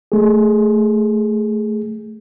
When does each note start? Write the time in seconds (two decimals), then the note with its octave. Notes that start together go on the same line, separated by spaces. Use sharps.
0.12 A3 G#4